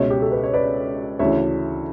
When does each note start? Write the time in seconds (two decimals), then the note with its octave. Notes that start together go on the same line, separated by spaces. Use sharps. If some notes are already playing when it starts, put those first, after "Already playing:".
Already playing: C#2 B2 C#5 E5
0.10 G4
0.22 A4
0.32 B4
0.44 C#5
0.54 B4 D5
1.19 D2 C#3 E3 C#5 E5